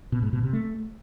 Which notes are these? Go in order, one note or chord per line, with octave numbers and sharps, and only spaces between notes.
B2
G#2
B2
C3
A3